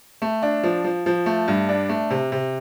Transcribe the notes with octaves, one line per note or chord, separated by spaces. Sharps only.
A3
D4
F3
F3
F3
A3
G2
D4
A3
C3
C3